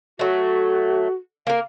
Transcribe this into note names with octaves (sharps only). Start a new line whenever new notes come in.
F#3 A3 F#4
A#3 A#4 F5